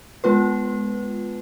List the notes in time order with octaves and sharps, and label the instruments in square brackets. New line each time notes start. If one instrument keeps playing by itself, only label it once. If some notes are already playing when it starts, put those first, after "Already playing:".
[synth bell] G#3 B3 F4 B4